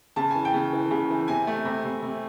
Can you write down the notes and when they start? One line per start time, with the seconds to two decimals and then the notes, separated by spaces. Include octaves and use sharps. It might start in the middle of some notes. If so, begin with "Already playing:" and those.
0.16 C#3 A5
0.31 E3 G#5
0.45 G5
0.54 C#3
0.73 E3
0.91 C#3
1.10 E3
1.28 C3 G#5
1.47 A3
1.65 C3
1.85 C3
2.02 C3